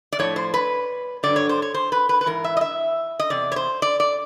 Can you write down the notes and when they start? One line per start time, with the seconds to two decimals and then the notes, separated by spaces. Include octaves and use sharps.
0.13 D5
0.19 A2 F3 C#5
0.36 C5
0.54 B4
1.23 G2 D3 F#3 D5
1.36 C#5
1.49 C5
1.62 C#5
1.74 C5
1.92 B4
2.09 B4
2.21 B4
2.26 G#2 E3 A#4
2.44 E5
2.57 D#5
2.61 E5
3.20 D#5
3.30 E2 C3 D5
3.52 C#5
3.56 C5
3.82 D5
4.00 D5